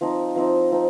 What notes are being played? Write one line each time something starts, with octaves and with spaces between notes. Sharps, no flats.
F3 C4 D#4
F3 C4 D#4
F3 C4 D#4